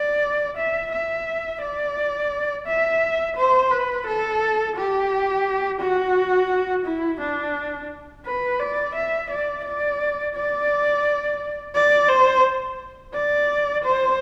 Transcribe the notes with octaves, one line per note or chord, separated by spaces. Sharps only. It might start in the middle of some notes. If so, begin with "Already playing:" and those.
Already playing: D5
E5
E5
D5
E5
C5
B4
A4
G4
F#4
E4
D4
B4
D5
E5
D5
D5
D5
D5
C5
D5
C5